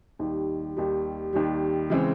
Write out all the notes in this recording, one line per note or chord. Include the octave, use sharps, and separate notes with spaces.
D#2 D#3 G3
D#2 D#3 G3
D#2 D#3 G3
C#3 E3 G#3 C4